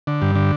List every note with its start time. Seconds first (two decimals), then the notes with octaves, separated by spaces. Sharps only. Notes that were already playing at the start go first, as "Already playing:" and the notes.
0.07 D3
0.22 G2
0.35 D3